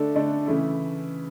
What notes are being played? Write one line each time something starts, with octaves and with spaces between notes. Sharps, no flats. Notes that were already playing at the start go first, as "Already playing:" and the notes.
Already playing: D3 A3 D4 A4
D3 A3 D4 A4
C#3 E3 A3 E4